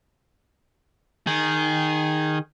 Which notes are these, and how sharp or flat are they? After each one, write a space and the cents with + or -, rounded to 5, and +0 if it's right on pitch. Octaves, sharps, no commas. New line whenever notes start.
D#3 -5 G#4 +0